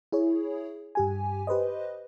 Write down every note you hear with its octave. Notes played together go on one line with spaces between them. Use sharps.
E4 G#4 C#5
G2 G4 G#5
G4 B4 C5 D#5